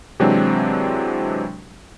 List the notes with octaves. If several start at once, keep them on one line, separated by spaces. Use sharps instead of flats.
C3 E3 F#3 G#3 C4 D4